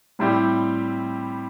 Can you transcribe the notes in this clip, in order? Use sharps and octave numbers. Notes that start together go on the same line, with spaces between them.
A2 G3 C4 E4 G4